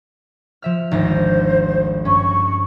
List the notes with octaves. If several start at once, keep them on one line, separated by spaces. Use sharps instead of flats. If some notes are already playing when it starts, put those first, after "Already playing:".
F3 E5 F6
G#1 D2 C5 A#6
G2 C#4 C#6